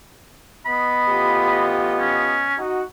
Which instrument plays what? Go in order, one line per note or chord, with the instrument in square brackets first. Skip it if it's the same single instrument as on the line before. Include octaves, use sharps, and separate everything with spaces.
[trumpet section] B3 D#5 [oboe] B5
[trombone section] A1 F4 G4
[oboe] C#4
[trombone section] D#4 F#4